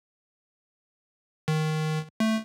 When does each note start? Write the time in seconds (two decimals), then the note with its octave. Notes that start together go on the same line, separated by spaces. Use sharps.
1.48 D#3
2.20 A3